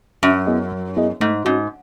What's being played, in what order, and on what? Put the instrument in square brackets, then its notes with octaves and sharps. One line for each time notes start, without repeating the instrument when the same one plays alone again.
[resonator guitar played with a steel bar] F#2 [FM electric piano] F#3
[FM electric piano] B3 E4 G#4 D#5
F#3
B3 E4 G#4 D#5
[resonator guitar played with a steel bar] G#2 [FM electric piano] A3
[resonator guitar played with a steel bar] G#2 [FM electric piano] C#4 F#4